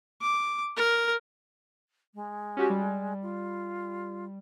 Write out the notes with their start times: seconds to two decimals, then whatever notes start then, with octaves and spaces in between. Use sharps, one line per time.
0.22 D6
0.77 A#4
2.14 G#3
2.57 C#4 F#4 G4
2.70 G3
3.22 F4